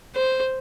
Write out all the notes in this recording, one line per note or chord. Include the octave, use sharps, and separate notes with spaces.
C5